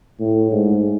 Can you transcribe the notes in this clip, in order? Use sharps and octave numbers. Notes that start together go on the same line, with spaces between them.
A2
G#2